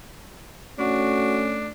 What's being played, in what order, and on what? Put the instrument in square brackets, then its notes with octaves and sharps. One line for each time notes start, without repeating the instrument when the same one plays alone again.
[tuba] A3 [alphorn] C#4 [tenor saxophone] D4 [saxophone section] F#4